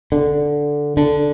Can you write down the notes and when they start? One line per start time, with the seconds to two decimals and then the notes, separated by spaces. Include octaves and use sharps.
0.12 D3
0.97 D3